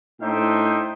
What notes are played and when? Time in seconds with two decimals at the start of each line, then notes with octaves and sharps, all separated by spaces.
0.21 A2 D4 D#4 C5 E5 G5